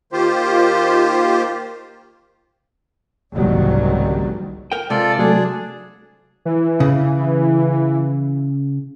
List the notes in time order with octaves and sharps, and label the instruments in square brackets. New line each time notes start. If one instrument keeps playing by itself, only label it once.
[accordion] D#3 A#3 F4 G4 C5
[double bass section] F#1 C2 G#2 D#3 F#3 G3
[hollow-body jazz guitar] A#4 G5
[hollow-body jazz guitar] C3 G#3 [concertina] F4 A4 D5
[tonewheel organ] F#3 A3 [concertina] D4 G#4
[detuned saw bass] E3
[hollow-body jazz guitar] C#3